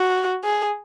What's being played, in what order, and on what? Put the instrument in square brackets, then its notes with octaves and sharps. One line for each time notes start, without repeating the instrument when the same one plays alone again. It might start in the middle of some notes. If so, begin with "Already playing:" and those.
Already playing: [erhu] F#4
G#4